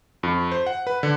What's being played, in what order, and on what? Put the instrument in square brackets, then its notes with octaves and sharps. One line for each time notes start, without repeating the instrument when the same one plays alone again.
[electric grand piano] F2
C5
F#5
B4
D3